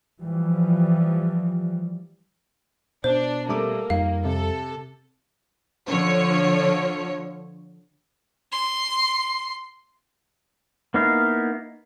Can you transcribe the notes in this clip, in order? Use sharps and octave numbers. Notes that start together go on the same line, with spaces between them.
E3 F3 G3
B2 D4 C5
G3 A3 A#3 D6
F2 G3 D#4 F5
C3 A4
D3 F3 C#5
C6
A#3 B3 D#4 E4 F5